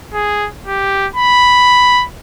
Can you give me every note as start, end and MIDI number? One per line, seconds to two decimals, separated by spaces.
0.14 0.48 68
0.67 1.07 67
1.16 2.05 83